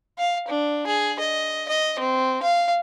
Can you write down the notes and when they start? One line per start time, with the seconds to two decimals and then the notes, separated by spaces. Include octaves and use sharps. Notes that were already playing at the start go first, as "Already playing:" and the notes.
0.18 F5
0.48 D4
0.87 G#4
1.20 D#5
1.69 D#5
1.99 C4
2.43 F5